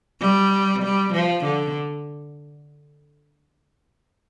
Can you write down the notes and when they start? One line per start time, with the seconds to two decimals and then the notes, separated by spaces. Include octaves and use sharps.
0.20 G3
0.83 G3
1.14 F3
1.45 D3